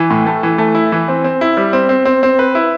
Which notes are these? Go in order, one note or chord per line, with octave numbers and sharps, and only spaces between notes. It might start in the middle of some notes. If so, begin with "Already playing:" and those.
Already playing: E3
A2
A3
E3
A3
E4
E3
C4
C4
E4
G3
C4
C4
C4
C4
B4
E4